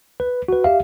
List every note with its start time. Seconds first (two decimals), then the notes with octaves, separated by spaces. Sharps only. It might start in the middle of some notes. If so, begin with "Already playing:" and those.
0.20 B4
0.48 F#4 B4
0.64 G4 E5 F5